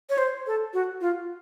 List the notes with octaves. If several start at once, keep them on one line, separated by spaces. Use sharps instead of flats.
C#5
C5
A4
F#4
F4